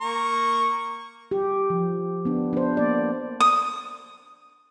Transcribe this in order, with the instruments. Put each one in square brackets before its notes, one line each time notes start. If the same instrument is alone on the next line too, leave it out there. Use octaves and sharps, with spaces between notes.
[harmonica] A#3 A#5 C#6
[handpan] G4
F3
B3 D4
D4 C5
A#3 D5
[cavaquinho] D#6